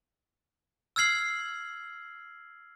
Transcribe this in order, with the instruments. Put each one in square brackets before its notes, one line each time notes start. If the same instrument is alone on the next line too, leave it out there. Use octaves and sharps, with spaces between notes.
[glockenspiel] E6 F6 G#6 C7 F#7